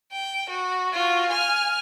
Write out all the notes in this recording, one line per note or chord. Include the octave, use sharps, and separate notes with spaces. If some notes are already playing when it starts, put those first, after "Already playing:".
G5
F#4
F4 F#4
G#5 F6